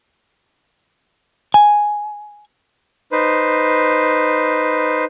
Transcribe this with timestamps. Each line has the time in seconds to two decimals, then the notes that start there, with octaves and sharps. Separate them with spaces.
1.54 G#5
3.12 D#4 B4 C5